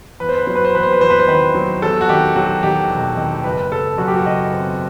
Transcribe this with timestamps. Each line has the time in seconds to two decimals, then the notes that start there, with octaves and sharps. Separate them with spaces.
0.20 E2 B4
0.29 C5
0.37 B4
0.47 F#3 C5
0.56 B4
0.65 C5
0.74 E2 B4
0.83 C5
0.93 B4
1.01 E2 C5
1.10 B4
1.20 C5
1.28 D#3 B4
1.55 F#3
1.82 E2 A4
2.01 F#4
2.09 D#3 G4
2.36 F#3 F#4
2.63 D#3 G4
2.90 E1
3.17 D#3
3.44 F#1 B4
3.71 F#1 A4
3.98 F#2 F#4
4.08 G4
4.16 F#4
4.25 F#1 D#5
4.52 C4